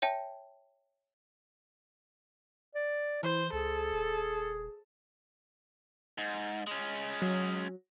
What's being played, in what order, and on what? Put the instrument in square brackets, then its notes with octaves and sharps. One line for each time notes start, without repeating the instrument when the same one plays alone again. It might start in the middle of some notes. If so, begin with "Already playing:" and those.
[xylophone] C#5 E5 G5 A5
[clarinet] D5
[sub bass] E3 [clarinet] E4 [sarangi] C5
[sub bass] C#2 [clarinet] G#4 [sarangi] A4
[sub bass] D#1
[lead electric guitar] G#2
G#3 C#4
[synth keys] F#3